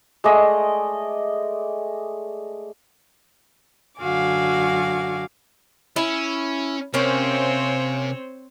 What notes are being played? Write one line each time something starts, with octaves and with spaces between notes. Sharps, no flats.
G#3 A3 D5 D#5
F#2 D3 F#4 F5 G#5 D6
C#4 E4
C3 A#3 C4 C#4 C5 C#5